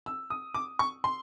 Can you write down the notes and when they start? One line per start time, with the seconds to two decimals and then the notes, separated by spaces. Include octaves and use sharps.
0.06 E6
0.30 D#6
0.54 D6
0.79 C#6
1.04 C6